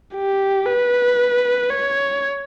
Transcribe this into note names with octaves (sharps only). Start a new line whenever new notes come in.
G4
B4
C#5